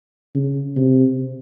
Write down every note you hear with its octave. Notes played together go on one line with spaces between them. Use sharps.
C#3
C3